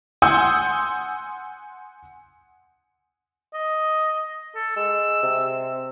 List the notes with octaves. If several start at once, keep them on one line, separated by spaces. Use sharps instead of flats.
F#5 G#5 C6 D#6 E6 G6
D#5
A4
G#3 E6
C3